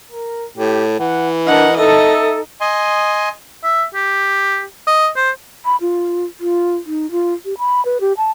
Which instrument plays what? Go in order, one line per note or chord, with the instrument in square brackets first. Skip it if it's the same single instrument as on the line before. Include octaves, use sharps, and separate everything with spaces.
[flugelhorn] A#4
[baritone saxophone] A2 [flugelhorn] G4
[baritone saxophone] E3 [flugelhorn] F#5
[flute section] D4 [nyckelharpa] A#4 F#5 [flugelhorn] D#5
[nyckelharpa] D#4 D#5 [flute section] A4 [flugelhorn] E5
[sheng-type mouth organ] D#5 G#5 C6
[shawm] E5
G4
D#5
C5
[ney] B5
F4
F4
D#4
F4
G4
B5
B4
G4
A5